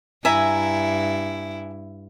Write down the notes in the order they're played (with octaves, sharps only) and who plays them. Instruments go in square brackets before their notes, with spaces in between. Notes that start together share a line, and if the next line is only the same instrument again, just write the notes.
[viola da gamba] G2 E4 [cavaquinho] E5 G#5 A#5